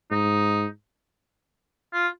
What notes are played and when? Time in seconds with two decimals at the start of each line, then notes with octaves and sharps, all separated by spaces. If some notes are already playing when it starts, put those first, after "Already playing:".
0.11 G#2 D#4
1.94 F4